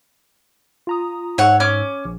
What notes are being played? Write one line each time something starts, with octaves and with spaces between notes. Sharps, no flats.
F4 A#5 D#6
G#2 C#5 F#5 E6
C#4 D6 F6
A#1